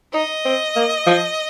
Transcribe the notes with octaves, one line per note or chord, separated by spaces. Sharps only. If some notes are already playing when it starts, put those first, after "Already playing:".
D#4 D#5
C4
A#3
F3